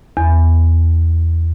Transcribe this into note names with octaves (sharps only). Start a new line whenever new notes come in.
E2